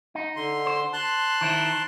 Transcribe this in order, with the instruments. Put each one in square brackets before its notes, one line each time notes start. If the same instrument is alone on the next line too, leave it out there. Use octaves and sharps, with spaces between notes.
[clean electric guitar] D#4
[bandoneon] D3 C6
[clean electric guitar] C5
[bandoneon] A5 C6 F#6
[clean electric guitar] D#3 E4 C5